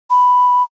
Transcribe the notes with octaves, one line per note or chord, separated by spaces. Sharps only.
B5